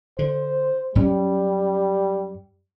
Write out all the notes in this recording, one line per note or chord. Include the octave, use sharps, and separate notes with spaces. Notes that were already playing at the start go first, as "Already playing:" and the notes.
D3 C5
F#2 G3 C#4